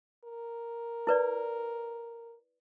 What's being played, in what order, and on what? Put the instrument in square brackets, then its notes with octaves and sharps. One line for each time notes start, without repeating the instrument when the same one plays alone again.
[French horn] A#4
[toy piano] E4 B4 D5